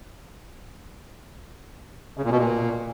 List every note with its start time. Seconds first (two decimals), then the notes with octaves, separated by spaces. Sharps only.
2.18 C#3
2.24 A#2
2.31 B2
2.38 A#2